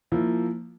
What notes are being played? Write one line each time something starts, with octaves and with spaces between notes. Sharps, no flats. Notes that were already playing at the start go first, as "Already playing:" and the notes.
F3 A#3 E4